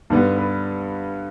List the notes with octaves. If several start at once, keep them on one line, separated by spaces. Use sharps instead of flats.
G2 D3 G3 B3
B4